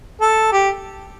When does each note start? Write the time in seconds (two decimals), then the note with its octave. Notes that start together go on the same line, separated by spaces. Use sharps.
0.21 A4
0.52 G4